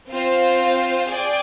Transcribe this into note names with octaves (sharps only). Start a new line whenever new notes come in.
C4 F4 C5 F5
G#4 D5 G5